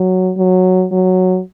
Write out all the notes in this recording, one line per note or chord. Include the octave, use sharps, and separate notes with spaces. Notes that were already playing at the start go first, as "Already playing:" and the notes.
Already playing: F#3
F#3
F#3